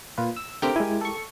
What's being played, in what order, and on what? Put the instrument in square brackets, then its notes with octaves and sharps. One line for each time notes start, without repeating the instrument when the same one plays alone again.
[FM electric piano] A#2 F4 B4
E6
[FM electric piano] D3 A3 C4 [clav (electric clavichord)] G4 A#4 G5
[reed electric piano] G#3 E4 [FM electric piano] G#5
[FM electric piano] A4 C#6